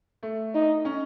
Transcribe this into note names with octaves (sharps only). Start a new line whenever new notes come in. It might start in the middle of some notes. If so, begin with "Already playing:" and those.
A3
D#4
C#4